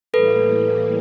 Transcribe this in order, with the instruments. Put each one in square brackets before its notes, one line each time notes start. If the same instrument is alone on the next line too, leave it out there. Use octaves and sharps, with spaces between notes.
[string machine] A2 E3 G3 A#3 [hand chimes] A4 B4